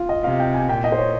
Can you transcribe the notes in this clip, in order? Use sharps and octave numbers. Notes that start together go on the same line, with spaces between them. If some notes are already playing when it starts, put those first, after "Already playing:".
Already playing: F4
D#5
C3 F5
G5
G#5
A#2 G5
D#5
C5
C#5